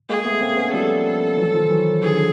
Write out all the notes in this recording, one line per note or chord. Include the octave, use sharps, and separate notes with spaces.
G#3 A#3 G#4
A3 B3
A#3 C4
B3 C#4
F3 G3 A4
E3 F#3
D#3 F3
E3 F#3
D3 E3 G#4
D3